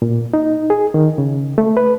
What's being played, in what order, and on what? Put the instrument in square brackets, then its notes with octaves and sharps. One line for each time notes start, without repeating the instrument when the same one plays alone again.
[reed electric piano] A#2
D#4
G#4
D#3
C#3
A3
B4